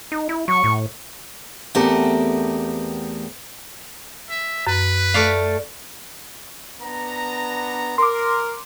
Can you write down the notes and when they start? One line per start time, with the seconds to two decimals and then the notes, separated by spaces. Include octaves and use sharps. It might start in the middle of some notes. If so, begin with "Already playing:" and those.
0.12 D#4
0.29 E4
0.48 F#3 C#6
0.64 A2
1.75 E2 A3 B3 C4 G4 A#4
4.30 E5
4.67 F#2 B4
5.14 A3 D5 F5
6.82 B3 D4 A#5
7.98 A#4 C6 D6